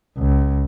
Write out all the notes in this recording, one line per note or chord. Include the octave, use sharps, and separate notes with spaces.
C#2